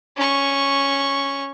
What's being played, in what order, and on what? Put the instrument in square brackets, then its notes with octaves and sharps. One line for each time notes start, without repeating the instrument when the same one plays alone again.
[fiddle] C#4 C#6